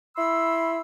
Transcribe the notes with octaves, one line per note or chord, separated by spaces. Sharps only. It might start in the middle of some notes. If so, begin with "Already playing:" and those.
E4 B5 C6 E6